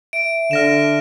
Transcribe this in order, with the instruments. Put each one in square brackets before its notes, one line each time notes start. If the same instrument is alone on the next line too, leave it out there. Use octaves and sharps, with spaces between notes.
[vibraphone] E5 [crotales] D7
[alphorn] D3 [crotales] F6 A#6 E7